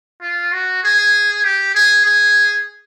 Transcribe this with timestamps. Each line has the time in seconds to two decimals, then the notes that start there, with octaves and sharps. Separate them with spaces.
0.21 F4
0.52 F#4
0.83 G#4
1.44 G4
1.75 G#4
2.05 G#4